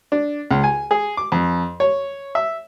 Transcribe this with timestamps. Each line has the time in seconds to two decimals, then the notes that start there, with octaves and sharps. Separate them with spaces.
0.12 D4
0.51 C#2
0.64 G#5
0.91 G#4
1.17 D6
1.32 F2
1.80 C#5
2.35 E5